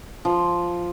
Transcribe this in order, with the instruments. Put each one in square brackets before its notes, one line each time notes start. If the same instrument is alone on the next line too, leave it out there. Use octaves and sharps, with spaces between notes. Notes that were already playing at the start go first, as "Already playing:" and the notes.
[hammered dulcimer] F3